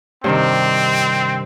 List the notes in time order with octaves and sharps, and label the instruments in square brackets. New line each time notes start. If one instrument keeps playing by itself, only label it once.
[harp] G2 C3 D#3 [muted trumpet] C4